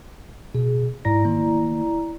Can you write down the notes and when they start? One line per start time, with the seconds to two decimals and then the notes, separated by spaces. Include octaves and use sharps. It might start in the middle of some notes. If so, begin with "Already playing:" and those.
0.55 B2 G#4
1.05 G#2 E4 D5 A#5 A#6
1.25 D#3 A#3